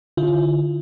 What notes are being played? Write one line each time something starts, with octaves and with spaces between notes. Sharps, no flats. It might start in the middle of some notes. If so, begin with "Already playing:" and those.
D3 E4 F4